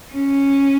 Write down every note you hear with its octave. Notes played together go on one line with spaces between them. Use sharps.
C#4